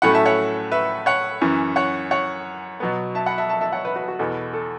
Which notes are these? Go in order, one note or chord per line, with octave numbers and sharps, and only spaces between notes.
A2 F#3 A3 C#4 F#5 B5
E5 A5
C#5 F#5
B4 E5
C#5 F#5
F#2 E3 C#4
C#5 F#5
C#5 F#5
B2 F#3 B3
E5 A5
F#5 B5
E5 A5
E5 A5
E5 A5
C#5 F#5
B4 E5
F#4 B4
F#4
E2 B2 B3 A4
A4